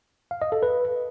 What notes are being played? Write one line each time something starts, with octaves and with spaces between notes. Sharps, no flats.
F5
D#5
A4
B4